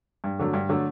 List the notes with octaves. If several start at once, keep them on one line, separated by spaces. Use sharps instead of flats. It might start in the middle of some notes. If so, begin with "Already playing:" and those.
G2
D3 F#3 A3
G2
D3 F#3 A3